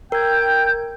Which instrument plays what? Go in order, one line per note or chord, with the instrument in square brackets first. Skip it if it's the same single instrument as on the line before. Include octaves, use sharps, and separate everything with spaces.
[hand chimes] A#4 G#6 [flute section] G5 G6